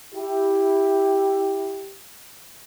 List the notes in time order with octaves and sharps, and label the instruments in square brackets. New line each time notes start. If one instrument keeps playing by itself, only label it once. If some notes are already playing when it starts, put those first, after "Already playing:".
[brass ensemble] E4 G4